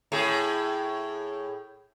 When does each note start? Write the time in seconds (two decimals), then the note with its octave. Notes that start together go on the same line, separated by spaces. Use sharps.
0.12 A2 G#4